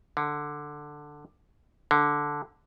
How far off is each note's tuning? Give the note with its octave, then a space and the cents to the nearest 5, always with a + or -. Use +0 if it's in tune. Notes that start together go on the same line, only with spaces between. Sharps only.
D3 +10
D3 +0